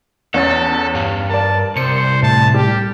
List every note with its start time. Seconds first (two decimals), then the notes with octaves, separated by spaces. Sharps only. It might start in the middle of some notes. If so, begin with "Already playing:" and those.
0.34 E2 C#4 A4 A6
0.95 G2 F5
1.29 A#4 D5 A5
1.77 C2 C5 C#7
2.23 A2 A5
2.54 G3 G4